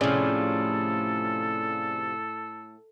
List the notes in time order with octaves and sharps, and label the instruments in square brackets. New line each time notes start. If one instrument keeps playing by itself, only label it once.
[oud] A2 [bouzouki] C3 F3 [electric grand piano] C#4 G#4 D5 [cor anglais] A4